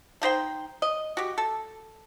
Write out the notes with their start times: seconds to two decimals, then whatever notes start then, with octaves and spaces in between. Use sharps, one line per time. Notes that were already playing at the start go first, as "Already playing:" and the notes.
0.22 A3 D#4 C5 G5
0.82 D#5
1.17 F#4 G4
1.38 A4